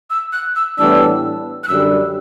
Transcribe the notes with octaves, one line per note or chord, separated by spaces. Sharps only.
E6
F#6
E6
A2 E3 G3 B3 D4 E6
F#6
F#2 D3 G3 E6